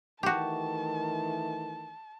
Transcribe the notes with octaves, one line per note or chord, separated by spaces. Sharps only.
D#3 E3 A3 F#4 G4 A5